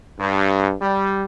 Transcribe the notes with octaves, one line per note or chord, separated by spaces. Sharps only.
G2
G3